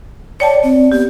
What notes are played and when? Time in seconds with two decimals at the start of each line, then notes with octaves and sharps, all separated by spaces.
0.40 C#5 D5 G5 A5
0.63 C4 D5
0.92 B3 G4